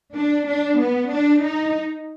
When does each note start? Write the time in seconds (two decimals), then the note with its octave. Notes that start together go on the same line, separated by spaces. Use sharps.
0.16 D4
0.49 D4
0.79 B3
1.12 D4
1.42 D#4